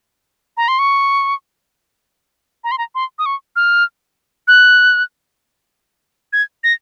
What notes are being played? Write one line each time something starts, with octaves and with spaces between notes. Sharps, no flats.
A#5
C6
C#6
A#5
C6
A#5
C6
D#6
C#6
F6
F#6
G#6
A#6